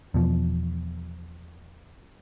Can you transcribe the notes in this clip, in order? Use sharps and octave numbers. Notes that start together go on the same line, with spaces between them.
E2 B2 F3